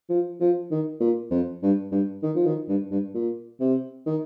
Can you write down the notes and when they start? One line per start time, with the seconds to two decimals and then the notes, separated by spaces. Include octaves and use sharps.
0.09 F3
0.40 F3
0.71 D#3
1.00 A#2
1.31 F2
1.62 G2
1.92 G2
2.23 D#3
2.35 F3
2.46 D#3
2.68 G2
2.91 G2
3.14 A#2
3.60 C3
4.06 D#3